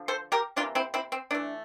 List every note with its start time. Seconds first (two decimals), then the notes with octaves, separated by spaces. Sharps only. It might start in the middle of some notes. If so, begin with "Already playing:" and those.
Already playing: D3 F3
0.08 A4 C5
0.32 G4 A#4
0.56 C3 E3 A#3 D4 F4
0.75 C4 E4
0.94 C4 E4
1.12 C4
1.31 E3 A3 D4